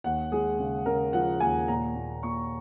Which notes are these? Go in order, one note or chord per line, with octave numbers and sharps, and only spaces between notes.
D#2 F#5
G#3 G#4
C#3
C#3 A#4
F3 F#5
D#2 G#5
A#2 A#5
A#2
A#2 C#6